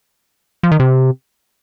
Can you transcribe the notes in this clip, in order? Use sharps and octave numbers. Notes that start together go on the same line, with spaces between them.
F3
D#3
C3